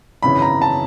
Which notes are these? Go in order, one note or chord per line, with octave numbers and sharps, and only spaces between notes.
G#1 F#2 C#3 E3 B5
A#5
A5